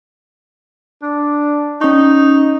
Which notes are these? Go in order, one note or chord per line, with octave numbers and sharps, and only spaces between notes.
D4
C#4 D#4 C#6